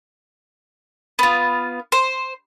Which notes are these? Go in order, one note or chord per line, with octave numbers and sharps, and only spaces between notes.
B3 F4
C5